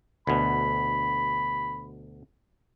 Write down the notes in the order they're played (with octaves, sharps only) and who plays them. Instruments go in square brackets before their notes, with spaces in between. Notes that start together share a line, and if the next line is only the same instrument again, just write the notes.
[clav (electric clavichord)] D2 B2 [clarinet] B5